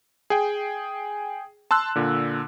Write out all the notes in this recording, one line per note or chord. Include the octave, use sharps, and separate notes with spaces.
G#4 G5
A5 C6 E6 F#6
A#2 D3